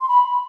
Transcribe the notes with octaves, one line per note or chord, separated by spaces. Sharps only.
C6
B5